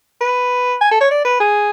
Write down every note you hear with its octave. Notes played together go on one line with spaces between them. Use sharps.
B4
G#5
A4
C#5
D5
B4
G#4